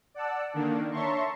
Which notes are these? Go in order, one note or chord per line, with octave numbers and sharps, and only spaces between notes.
D5 F#5 A5 E6
D3 D#3 A#3 D4
C#5 E5 A5 A#5 C6 C#6